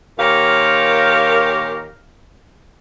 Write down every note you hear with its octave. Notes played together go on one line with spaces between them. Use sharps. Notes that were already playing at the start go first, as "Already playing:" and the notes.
A#2 D#3 G4 A#4 C#5 F5